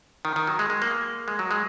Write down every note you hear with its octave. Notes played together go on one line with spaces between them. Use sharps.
D#3
D#3
F#3
G#3
G#3
A#3
G#3
F#3
G#3